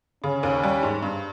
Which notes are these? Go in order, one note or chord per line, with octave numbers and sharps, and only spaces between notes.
C#3 C#4
D#2
G3
G#2
G2